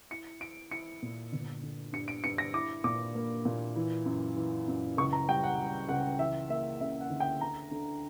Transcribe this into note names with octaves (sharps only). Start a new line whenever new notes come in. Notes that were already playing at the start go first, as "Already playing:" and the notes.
E4 C#7
E4 D7
E4 C#7
A#2
G1
D3
G2 C#7
D7
G2 C#7
A#6
E4 D6
A#2 D6
A#3
A#2
E3
F#2
E3
F#2
C#2 C#6
A#5
G3 G5
F#5
G3
C#2 F#5
E3 E5
A#3 E5
C#3 E5
F#5
D2
G5
D3 A#5
D3